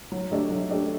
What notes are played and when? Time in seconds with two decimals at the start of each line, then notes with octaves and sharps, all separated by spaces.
0.12 F#3
0.31 A3 D4 G4 D5
0.50 F#3
0.71 A3 D4 G4 D5